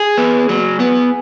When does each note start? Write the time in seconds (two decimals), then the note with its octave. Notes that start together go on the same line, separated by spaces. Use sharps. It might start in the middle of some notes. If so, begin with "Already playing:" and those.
Already playing: G#4
0.18 B3
0.49 F#3
0.80 B3